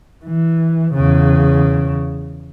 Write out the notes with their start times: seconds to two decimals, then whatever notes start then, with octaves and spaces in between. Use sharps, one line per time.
0.24 E3
0.94 E2 C#3